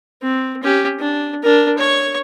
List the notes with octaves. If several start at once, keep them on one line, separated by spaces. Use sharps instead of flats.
C4
C#4 G4
D4
D4 A#4
C#5 C#6